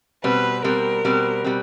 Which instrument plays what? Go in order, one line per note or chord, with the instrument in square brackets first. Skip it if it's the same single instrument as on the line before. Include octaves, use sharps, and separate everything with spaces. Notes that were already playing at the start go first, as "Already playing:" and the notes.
[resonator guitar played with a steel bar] B2 G3 C4 [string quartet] B4
[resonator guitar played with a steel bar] B2 G3 C4 [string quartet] A#4
[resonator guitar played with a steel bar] B2 G3 C4
B2 G3 C4